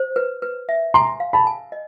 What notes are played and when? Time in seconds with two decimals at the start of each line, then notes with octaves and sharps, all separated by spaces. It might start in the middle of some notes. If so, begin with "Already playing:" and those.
Already playing: C5
0.16 B4
0.42 B4
0.69 E5
0.94 G#5 A#5 C6
1.20 F5
1.33 A5 B5
1.47 G#5
1.72 D#5